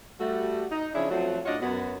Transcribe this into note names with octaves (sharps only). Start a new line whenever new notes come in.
G3 A3 F#4
D#4
C#3 F3 D4 E4 G#4 C#5
F2 F3 F#3 A3 F#4
A2 D4 F4 F#4 C#5 D#5
F#2 B3 F#4